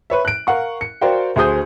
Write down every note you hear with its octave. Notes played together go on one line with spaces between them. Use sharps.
B4 C#5 E5
F#6 D7
A#4 F5 F#5 C#6
C#7
F#4 A#4 C5 D5 F5 G5
D2 F#4 G#4 C5 D#6 G6